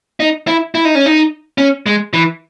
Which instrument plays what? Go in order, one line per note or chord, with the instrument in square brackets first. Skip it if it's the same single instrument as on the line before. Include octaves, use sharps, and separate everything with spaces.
[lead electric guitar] D#4
E4
E4
D#4
C#4
D#4
C#4
G#3
E3